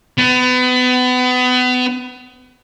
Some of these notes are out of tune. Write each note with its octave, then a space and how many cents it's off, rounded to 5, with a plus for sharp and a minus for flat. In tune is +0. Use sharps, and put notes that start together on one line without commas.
B3 +30